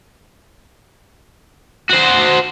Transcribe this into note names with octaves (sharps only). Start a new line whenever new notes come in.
F#4 C5